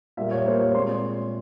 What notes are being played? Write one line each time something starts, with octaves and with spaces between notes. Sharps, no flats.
A#2 G3 A#3 E5
C#5
A#2 G3 A#3 C5
C#5
A#2 G#3 C4 C6